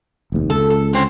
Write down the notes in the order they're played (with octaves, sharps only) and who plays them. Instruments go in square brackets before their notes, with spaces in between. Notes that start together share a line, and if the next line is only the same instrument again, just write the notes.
[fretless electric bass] F1 D#2
[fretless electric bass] C#2 [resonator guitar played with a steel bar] A4
[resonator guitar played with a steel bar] A4
D3 C4 C#4